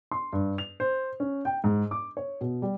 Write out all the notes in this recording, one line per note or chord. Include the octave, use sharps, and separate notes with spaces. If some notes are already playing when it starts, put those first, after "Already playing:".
C6
G2
F7
C5
C#4
G5
G#2
D6
C#5
B2
G3